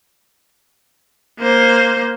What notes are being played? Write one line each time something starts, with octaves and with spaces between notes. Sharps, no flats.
A#3 C5